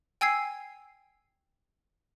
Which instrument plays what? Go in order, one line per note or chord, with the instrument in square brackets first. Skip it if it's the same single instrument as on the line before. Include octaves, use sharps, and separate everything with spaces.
[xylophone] G5 G#5 E6 G#6 C7